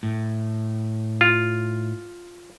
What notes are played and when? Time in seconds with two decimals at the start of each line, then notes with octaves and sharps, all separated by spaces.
0.03 A2
1.21 F4